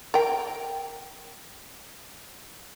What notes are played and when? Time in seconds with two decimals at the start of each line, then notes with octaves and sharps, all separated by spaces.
0.14 A#4 G5